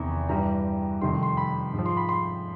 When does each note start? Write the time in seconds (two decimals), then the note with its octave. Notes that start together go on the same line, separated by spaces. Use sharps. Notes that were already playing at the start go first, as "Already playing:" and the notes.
Already playing: E2 C3 D#3 A#5
0.29 G2 E3 G3 A#5
1.01 F2 C3 D#3 G3 C6
1.23 C6
1.37 B5
1.73 G#2 F3
1.86 C6
1.97 B5
2.09 C6